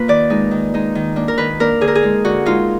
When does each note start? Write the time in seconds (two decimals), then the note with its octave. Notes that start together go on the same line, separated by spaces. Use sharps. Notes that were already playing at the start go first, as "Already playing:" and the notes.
Already playing: A#3 F4 B4
0.08 D#3 D5
0.30 G#3 D#4
0.51 D#3
0.74 G#3 D#4
0.95 D#3
1.16 A#3 D4
1.28 A#4
1.38 D#3 B4
1.60 A#3 D4 A#4
1.81 D3 G#4
1.88 A#4
1.95 G#4
2.03 G#3 D#4
2.24 D3 F#4
2.45 G#3 D#4 F4